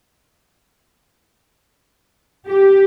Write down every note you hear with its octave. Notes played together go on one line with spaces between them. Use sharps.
G4